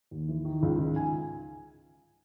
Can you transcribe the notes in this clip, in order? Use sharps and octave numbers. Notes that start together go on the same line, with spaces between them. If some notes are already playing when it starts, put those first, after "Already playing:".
D#2
E3
D#3
C#2
D#3
G#5